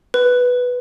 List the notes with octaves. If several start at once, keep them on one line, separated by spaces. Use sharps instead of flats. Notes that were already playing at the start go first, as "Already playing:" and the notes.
B4